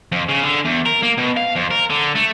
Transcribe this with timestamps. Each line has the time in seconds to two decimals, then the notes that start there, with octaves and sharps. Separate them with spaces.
0.12 F2
0.29 C#3
0.43 D3
0.65 E2
0.86 A#4
1.03 A#3
1.18 B2
1.37 F5
1.55 F2
1.71 A#4
1.90 D3
2.16 A3